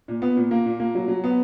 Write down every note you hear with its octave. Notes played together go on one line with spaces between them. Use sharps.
A#2
B3
A#2
A#3
A#2
A#3
F#3
F#3
B3